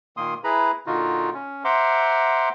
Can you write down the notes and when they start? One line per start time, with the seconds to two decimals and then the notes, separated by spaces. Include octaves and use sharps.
0.17 A#2 D#3 A#3 C6 D#6
0.44 E4 G#4 B4 A#5 B5
0.86 A#2 D3 D#4 F4 F#4
1.34 C#4
1.64 C5 E5 F#5 A#5 C6 D6